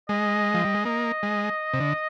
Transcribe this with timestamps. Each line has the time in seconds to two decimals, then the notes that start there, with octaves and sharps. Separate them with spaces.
0.09 G#3 D#5
0.54 F3
0.65 G3
0.75 G#3
0.85 A#3 D#5
1.23 G#3
1.74 C3
1.80 D3